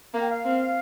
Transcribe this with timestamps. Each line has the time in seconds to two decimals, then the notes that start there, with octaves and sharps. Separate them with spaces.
0.13 A#3 F5
0.20 G5
0.28 F5
0.44 C4